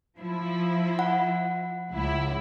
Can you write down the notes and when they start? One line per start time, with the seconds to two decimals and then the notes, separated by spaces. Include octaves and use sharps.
0.18 F3 E4
0.99 F#5
1.91 C#2 E4